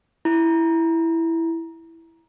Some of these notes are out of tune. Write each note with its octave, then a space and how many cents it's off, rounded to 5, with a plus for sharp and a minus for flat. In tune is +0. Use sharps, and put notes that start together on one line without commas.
E4 +0 A#5 +20